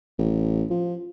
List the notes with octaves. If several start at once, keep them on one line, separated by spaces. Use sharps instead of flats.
A1
F3